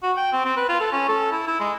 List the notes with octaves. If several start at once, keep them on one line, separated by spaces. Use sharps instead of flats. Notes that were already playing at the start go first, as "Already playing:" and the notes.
F#4
G5
C4
C4
B4
F4
A4
C#4
A4
E4
E4
G#3